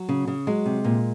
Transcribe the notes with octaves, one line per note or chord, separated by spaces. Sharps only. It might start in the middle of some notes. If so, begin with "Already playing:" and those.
Already playing: F#3
C#3
C#3
F#3 G#3
C3
A#2